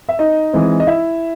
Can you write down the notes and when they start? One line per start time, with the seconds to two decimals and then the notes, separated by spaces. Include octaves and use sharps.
0.09 E5
0.19 D#4 D#5
0.53 E3 G#3 C4
0.80 D#5
0.87 E4 E5